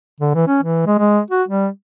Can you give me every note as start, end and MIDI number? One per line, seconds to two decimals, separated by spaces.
0.20 0.32 50
0.35 0.46 52
0.47 0.59 61
0.63 0.85 52
0.86 0.95 56
0.98 1.20 56
1.31 1.43 66
1.48 1.68 55